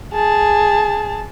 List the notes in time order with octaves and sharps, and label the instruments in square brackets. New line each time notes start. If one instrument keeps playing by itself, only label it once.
[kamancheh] G#4 A5